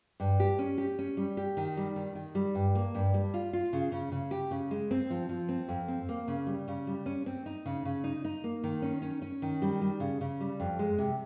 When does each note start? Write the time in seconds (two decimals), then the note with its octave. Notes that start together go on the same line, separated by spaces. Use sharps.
0.20 G2
0.40 G4
0.59 C#4
0.78 G4
0.99 C#4
1.17 G3
1.37 G4
1.57 D#3
1.77 G3
1.96 D#3
2.15 D#3
2.35 G3
2.55 G2
2.75 A#3
2.95 G2
3.14 G3
3.34 F4
3.53 F4
3.73 C#3
3.92 C#3
4.12 C#3
4.31 G4
4.51 C#3
4.71 G#3
4.91 C4
5.10 F3
5.29 F3
5.49 C4
5.68 F2
5.88 C4
6.09 A#3
6.28 C#3
6.47 G3
6.68 C#3
6.87 G3
7.06 C#4
7.26 C4
7.46 D#4
7.65 C#3
7.85 C#3
8.04 D#4
8.25 D#4
8.44 A#3
8.64 D#3
8.82 C#4
9.02 C#4
9.22 C#4
9.42 D#3
9.62 G3
9.82 G3
10.00 C#3
10.21 C#3
10.40 G3
10.60 F2
10.79 G#3
10.98 C3